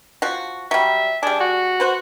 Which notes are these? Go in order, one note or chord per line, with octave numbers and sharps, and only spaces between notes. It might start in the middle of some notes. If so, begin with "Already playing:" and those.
F3 F#4
F#3 G3 E5
G3 D4 G#4
F#4
B4 C5 F#5